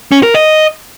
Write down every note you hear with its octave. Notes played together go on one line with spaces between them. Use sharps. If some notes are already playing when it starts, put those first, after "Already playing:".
C#4
A#4
D#5